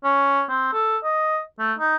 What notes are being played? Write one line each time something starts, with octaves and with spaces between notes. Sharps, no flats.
C#4
C4
A4
D#5
A3
D#4